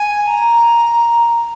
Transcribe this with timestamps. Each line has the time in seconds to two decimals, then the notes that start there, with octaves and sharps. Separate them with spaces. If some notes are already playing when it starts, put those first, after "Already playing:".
Already playing: G#5
0.27 A#5